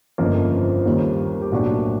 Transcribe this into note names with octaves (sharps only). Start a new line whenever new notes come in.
G1 F2 C#3 F3 A#3 F4
D#2 D#3 G3 A#3 C#4
G4
B1 A2 F#3 A#3 D4 F#4